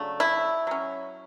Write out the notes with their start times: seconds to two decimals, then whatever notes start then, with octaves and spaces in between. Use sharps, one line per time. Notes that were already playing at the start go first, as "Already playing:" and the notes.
Already playing: C#3 F#3 A3 D4
0.20 E4
0.67 F#3 C#4